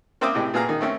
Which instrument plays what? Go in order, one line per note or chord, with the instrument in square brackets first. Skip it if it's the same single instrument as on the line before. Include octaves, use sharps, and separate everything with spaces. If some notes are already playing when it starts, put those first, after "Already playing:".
[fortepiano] A#3 C4 C5 E5 D6 D#6
A2 C3 G#3
A#2 B3 G#4 F5 A#5
D#3
A3 C4 C#4